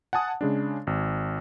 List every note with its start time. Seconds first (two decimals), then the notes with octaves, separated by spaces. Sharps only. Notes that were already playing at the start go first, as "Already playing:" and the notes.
0.13 F#5 G#5 A5 D#6
0.41 C#3 G#3 D4
0.87 G#1